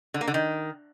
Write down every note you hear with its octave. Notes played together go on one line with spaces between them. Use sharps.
D3
A#3
D3
D#3